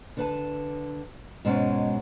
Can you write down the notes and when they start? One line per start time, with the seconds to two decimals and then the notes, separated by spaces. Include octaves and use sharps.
0.17 D3 B4 A5
1.45 G#2 B2 G#3 C#4 D#4